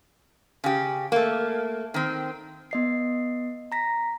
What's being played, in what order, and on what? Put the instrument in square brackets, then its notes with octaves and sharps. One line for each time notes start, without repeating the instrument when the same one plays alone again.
[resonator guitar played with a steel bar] C#3 G4
A3 A#3
D#3 C4
[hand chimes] B3 D#5 C7
A#5 A#6 B6